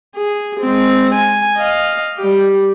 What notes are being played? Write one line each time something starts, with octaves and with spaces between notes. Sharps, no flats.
G#4
G#3 C4
G#5
D#5 F5
G3 G4